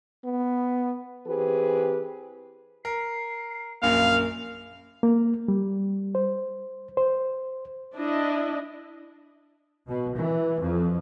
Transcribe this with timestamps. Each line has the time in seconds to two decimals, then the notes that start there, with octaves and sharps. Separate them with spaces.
0.25 B3
1.26 E3 C4 G4 G#4 B4
2.85 A#4 C7
3.83 A#1 F#2 A#3 F5 F7
5.03 A#3
5.48 G3
6.15 C5
6.97 C5
7.95 D4 E4 D#5
9.88 B2
10.18 E3
10.61 F2